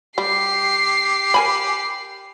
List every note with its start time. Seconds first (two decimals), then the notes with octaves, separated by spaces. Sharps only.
0.18 G3 G4 C7
1.34 A#4 G#5 B5